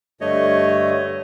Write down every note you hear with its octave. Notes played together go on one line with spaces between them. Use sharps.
G2 D3 A3 C#5 D#5